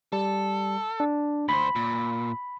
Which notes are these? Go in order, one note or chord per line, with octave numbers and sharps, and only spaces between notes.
G3 A4
D4
D2 C5 B5
A#2